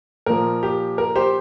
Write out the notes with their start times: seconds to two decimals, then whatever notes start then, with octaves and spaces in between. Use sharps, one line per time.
0.26 A#2 F3 A#4
0.63 G4
0.98 A#4
1.16 G4 C5